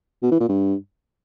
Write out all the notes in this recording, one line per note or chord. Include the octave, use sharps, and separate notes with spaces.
B2
E3
A#2
G2